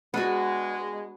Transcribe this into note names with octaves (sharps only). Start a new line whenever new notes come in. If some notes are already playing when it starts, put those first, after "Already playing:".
G#3 B3 D4 F#4